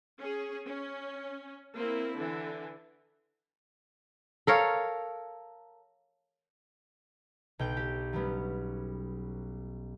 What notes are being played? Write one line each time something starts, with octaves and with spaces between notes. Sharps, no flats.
C#4 G#4
C#4
A#3 C4 E4
D3 E3
A4 A#4 C#5 F5
B1 G5 G6 D7
G4
F#3 G3 B3 C#4